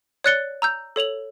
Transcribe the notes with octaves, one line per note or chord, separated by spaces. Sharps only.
C#5 D5 F#6 A6 C#7 G7
A#5 E6 G6
A4 C#5 F7 F#7